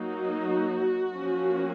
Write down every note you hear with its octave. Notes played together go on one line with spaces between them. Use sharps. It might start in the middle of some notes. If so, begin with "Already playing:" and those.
Already playing: F#3 A#3 D#4 F#4
F3 A#3 C#4